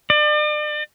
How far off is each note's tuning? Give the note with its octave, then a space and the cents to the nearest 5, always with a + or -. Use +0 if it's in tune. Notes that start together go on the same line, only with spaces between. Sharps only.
D5 +40